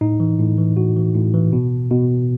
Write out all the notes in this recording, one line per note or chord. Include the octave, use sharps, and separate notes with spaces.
A2 D#4
E3
A2
E3
A2 F#4
E3
A2
E3
B2
B2